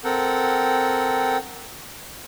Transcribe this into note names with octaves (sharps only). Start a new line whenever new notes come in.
C4 A4 A#4 F#5 G5